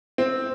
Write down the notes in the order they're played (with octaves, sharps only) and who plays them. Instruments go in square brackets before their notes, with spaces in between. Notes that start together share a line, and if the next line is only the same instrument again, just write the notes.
[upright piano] C4